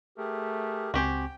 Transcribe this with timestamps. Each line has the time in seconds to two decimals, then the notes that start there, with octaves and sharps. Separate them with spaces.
0.18 A3 G4 G#4 A#4
0.94 C#2 C4 F#4 G4 C5 G5 G#5